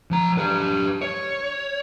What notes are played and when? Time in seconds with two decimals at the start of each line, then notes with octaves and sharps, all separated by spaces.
0.11 F3 A#5
0.38 G4 B4
1.02 C#5